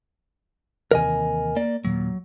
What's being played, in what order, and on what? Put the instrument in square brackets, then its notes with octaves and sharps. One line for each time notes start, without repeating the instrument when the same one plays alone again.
[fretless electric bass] D#2 C3 E3 [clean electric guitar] A#4 D#5 G#5
[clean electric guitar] A#3 D5
[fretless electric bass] D#2 A#2 [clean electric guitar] F#3